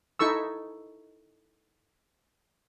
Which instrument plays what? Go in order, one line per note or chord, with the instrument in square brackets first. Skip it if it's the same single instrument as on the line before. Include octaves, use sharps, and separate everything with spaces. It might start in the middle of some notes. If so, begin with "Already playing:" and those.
[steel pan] D#4 E4 A4 C#6 E6